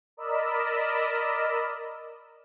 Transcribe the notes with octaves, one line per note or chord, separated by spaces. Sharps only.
A#4 D5 D#5 B5 E6